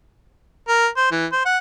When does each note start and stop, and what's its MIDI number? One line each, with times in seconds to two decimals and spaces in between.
0.69 0.87 70
0.97 1.06 72
1.11 1.26 52
1.32 1.43 72
1.46 1.58 78